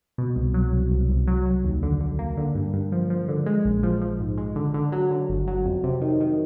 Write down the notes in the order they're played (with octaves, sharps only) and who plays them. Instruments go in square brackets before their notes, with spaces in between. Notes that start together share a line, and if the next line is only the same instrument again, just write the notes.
[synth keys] B2
C2
F#3
C2
C2
C2
F#3
F#3
D#2
D3
D3
A#3
D3
G2
G2
F3
F3
D3
G#3
A#1
F3
F3
G#2
G#3
D3
D3
F#3
D3
G1
F#3
F2
C3
D#3
D#3